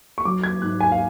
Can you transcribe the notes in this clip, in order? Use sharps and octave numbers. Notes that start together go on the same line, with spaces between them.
C#6
F#3 D6
G#6
G#2 F#6
G#5
F5